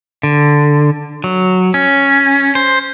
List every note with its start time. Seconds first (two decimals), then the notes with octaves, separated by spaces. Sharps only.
0.23 D3
1.24 F#3
1.74 C#4
2.55 C5